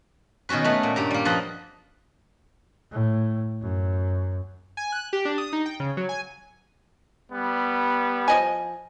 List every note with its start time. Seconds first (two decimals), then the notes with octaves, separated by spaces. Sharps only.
0.49 B2 D#3 C#4 F#4 B4
0.64 A3 B3 B4
0.83 A#2
0.96 G2 G4 A#5
1.11 G3 A#3
1.25 F3 B4 D#5 F#5
2.91 A2
3.61 F#2
4.77 G#5
4.92 F#6
5.13 G4
5.25 D4
5.38 D#6
5.53 D#4
5.66 G5
5.80 C#3
5.97 F#3
6.09 G#5
7.31 G3 B3
8.28 F3 D#5 G#5